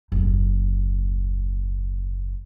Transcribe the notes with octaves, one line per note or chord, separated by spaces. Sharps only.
F#1 D#2